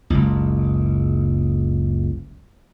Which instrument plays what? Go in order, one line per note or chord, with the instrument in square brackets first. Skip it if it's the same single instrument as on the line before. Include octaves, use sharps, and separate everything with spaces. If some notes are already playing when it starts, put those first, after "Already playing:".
[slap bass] F#1 C#2